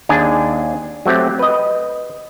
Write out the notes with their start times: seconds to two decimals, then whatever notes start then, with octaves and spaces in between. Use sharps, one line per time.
0.09 D#2 D4 G#4 G#5
1.06 F#3 A3 C4 G4
1.39 B4 D#5